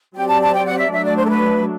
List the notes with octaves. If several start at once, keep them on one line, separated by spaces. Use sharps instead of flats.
F#3 C4 G4 D5 G5
A5
A5
G5
F#5
E5
F#3 A3 D4 E5
D5
C5
A4
B4